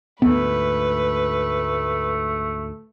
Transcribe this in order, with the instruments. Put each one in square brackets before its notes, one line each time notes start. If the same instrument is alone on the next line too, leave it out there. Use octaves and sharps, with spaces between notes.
[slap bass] D2 G#2 [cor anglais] A3 [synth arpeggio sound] B3 [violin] B4